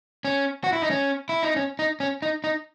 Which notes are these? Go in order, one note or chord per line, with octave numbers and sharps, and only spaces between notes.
C#4
F#4
E4
D#4
C#4
E4
D#4
C#4
D#4
C#4
D#4
D#4